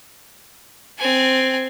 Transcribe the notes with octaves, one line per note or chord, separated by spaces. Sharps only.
C4 G#5